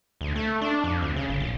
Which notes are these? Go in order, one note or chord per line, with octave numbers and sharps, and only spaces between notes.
D2
A3
D4
F2
D2
C#3
G1
A#1